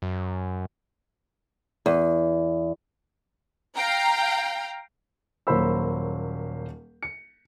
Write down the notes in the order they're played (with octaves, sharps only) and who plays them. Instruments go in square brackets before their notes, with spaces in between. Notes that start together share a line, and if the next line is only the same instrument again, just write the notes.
[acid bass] F#2
[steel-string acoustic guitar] E2
[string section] F5 G5 A#5
[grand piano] D#1 F#3 A#3 C5 B5 E6
C#7